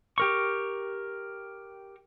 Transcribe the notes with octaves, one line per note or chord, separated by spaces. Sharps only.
G4 A#4 C#6